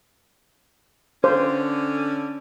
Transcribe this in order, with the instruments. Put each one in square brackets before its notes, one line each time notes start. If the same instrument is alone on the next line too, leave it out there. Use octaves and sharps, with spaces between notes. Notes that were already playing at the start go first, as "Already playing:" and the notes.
[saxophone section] D3 C#4 [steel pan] C5